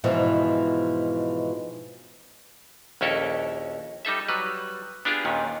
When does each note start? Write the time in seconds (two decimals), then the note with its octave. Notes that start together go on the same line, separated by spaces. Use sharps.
0.04 G#2 B2 E3 F3
3.01 A#1 D#2 C#4 E4 A4 A#4
4.05 G3 D#4 A4 E5
4.29 F#3 G3 B4
5.05 B3 D4 F4 G4 G#4
5.25 D#2 A#2 D#3 C#4